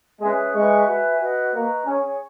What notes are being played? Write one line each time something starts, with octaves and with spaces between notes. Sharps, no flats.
G#3 C#4 G#4 B4 E5
G#3 B4 E5 G#5 C#6
F#4 B4 E5 G#5
F#4 B4 D#5
A#3 B4 D#5 A#5 C#6
C#4 G#4 C#5 G#5 C#6